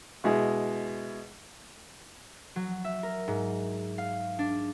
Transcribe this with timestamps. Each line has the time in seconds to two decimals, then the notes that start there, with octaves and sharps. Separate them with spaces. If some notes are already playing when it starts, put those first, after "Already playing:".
0.24 B2 G#3 E4
2.56 F#3
2.84 E5
3.03 A#4
3.28 G#2
3.98 F5
4.39 D4